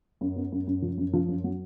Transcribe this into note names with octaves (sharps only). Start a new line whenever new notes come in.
F#2
B3
F#2
F#2
F3
F#2
F3
F#2
F#3